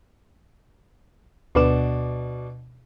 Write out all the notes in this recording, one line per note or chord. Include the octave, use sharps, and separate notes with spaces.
D2 B2 D4 B4 D6 E7